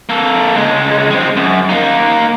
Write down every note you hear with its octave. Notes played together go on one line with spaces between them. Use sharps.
A#3 A4
C#2 G#3
G#3 C4
F#2
A#3 D#4